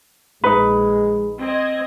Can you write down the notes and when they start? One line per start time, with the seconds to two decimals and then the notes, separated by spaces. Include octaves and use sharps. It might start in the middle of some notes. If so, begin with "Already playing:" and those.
0.44 A#1 G#3 D#4 B4
1.39 C4 D#5 G#6